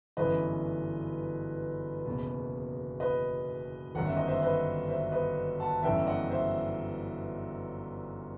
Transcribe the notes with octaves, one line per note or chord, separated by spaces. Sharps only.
G1 F#2 E3 B4 D#5
F#1 E2 B2
B4 D#5
G1 F#2 D#3 F#5
E5
D#5
C5 E5
B4 D#5
C5 E5
B4 D#5
F#5 A5
G1 F#2 E3 E5 G5
D#5 F#5
C5 E5